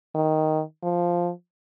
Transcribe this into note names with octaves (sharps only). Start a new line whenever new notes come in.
D#3
F3